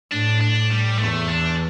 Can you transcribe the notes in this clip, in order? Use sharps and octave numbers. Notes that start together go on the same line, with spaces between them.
A2 D4
D4
G3
E2 A3
D4